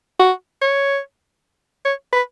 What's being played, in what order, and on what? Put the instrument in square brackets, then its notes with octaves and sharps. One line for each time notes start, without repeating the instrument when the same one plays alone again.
[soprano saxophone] F#4
C#5
C#5
B4